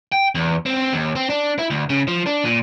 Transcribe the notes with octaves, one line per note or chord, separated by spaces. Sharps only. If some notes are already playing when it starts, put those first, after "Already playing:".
G5
E2
C4
D#2
C4
D4
E4
D2
C#3
F3
D4
A#2